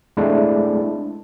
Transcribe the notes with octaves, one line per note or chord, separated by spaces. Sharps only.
G#3 A3 C4 D4 E4